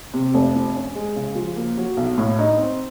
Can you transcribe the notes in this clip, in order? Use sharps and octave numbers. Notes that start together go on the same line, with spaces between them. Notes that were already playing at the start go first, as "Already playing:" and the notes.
C3
F1
F2
C#4
G#3
C#3
F3
A#3
F#3
B1
A2
D#4
C4